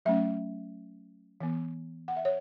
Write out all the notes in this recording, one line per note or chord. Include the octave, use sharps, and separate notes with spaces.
F#3 A3 C#4 E5
E3 B3
F#5
E5
C#5